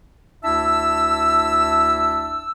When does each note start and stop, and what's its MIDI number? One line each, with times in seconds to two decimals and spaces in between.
0.44 2.52 38
0.44 2.52 62
0.44 2.52 64
0.44 2.52 76
0.44 2.52 81
0.44 2.52 88